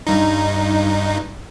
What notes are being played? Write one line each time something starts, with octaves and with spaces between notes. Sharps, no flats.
G2 D#4